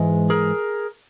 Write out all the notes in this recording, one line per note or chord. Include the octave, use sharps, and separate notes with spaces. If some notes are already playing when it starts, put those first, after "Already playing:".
Already playing: G#2 E3 G#3
G#4 A#4